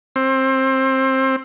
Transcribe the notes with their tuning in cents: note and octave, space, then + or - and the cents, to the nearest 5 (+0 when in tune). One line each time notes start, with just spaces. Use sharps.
C4 +20